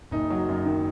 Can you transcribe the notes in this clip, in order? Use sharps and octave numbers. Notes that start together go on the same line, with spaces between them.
F#1 D#4
F#3
F#2
D#3